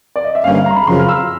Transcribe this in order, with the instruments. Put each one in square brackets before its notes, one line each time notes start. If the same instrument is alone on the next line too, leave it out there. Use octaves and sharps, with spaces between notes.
[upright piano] D5
D#5
E5
[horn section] G2 D3 G3 A#3 C#4 [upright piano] F5
[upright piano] F5
A#5
C6
B5
[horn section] F#2 C#3 F3 [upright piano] C6
[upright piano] F6
E6